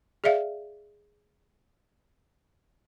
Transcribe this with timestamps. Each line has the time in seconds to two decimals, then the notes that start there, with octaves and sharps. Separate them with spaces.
0.24 G#4 D5 E5 F5